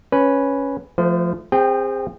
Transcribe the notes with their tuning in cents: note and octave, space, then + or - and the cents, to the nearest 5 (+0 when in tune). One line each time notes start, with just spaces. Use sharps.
C#4 +0 B4 +0
F3 +0 A3 +0 C5 -40
C4 +0 G#4 -35 G5 +0